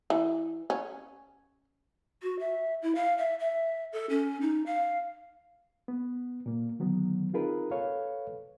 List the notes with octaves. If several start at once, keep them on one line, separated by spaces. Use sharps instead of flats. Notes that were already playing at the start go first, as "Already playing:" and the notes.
E3
C#4
F#4
E5
E4
F5
E5
E5
A4
C#4
D#4
F5
B3
A#2 A#3
D3 D#3 F#3 B3
C4 D#4 F4 G#4 A#4 B4
A4 B4 C#5 F5